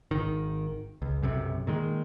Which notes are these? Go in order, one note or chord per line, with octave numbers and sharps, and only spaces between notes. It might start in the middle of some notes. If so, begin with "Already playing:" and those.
G#1 D#3
C#2
B1 F#2 C3
A#2 D#3 G#3